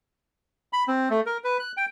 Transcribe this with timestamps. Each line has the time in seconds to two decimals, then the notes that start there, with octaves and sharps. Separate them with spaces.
0.73 B5
0.88 C4
1.10 A3
1.26 A#4
1.44 B4
1.59 F#6
1.77 G5